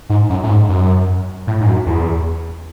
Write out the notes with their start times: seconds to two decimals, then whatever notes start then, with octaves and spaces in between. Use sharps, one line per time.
0.10 G#2
0.30 F#2
0.44 A2
0.49 G#2
0.69 F#2
1.47 A2
1.61 G#2
1.66 F#2
1.87 E2